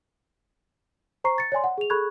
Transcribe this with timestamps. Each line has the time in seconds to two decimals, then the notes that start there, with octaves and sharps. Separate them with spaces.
1.24 C5 A#5 C#6 C7
1.38 A6 C#7
1.52 C#5 D5 G#5 C6
1.64 F#5
1.78 G#4 F7
1.90 G#4 A4 B5 C#6 F#6 G#6